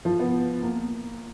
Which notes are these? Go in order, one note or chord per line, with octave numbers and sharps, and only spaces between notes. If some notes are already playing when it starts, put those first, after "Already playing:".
F3
B3
A#3